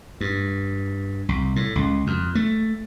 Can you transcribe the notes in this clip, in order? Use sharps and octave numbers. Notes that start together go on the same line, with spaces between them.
G2
C2
A2
C#2
F2
A3